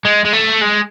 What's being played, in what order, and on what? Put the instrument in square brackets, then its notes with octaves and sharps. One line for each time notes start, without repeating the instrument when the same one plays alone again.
[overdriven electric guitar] G#3
G#3
A3
G#3